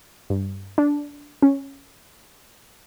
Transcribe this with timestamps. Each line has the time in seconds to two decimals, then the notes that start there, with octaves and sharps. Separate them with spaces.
0.30 G2
0.78 D4
1.42 C#4